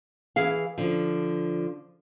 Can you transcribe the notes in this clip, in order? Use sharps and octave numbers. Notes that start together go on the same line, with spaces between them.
E3 G#4 F5
D3 F3